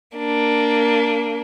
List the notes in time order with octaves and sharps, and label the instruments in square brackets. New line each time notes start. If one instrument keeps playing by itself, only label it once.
[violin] A#3 D4